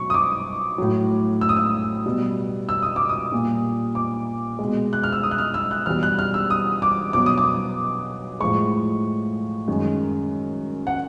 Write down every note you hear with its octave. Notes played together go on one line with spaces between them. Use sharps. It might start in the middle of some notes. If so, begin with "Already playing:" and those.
Already playing: B2 F#3 C#6
D#6
D6
A2 F#3
E6
D#6
E6
B2 G3
E6
D#6
D6
D#6
A#2 G3
D6
G#3
B2
F#6
F6
E6
D#6
F#6
F6
E6
F#6
E2 B2 G3 F6
F#6
F6
E6
D#6
D6
B2 F#3 D6
D#6
D6
A2 F3 G#3 C#6
F#2 D#3 G#3
F#5